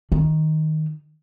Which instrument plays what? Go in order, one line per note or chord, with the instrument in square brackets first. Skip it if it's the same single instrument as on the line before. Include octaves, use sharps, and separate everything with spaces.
[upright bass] D#3